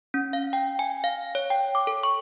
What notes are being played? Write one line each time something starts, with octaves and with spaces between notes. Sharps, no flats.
C#4
F5
G5
G#5
F5
C#5
G5
D6
A4
C#6